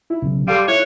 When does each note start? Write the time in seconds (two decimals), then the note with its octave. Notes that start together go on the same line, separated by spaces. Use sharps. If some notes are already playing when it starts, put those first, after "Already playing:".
0.10 E4
0.22 B1 C#3
0.48 G3 A4 F5 C6 D6
0.68 E4 C#5 F#6